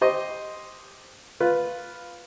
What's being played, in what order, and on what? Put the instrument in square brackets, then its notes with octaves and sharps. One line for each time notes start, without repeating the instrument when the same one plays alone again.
[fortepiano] G4 C5 D#5
F4 B4